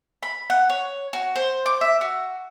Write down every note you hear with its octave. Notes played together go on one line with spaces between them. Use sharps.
B5
F#5
C#5
F#4
C5
D6
E5
F#4